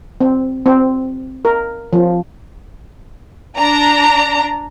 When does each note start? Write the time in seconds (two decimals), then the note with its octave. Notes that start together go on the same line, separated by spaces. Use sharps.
0.21 C4
0.66 C4
1.45 A#4
1.93 F3
3.57 D4 A#5